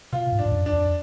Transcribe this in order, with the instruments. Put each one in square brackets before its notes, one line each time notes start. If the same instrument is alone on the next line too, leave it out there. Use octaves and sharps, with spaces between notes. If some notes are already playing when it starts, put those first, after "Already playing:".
[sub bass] B2 [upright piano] F4
[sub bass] G#2
[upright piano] D4
[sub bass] G#2
F#2
[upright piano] D4
[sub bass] F2